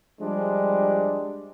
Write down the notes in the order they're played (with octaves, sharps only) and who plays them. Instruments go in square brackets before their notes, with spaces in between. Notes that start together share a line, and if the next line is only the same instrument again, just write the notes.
[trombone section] F3 G3 G#3 D4